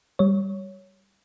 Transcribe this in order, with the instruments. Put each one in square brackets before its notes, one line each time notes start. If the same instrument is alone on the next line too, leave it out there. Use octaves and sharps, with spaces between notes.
[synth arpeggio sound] G3 C#5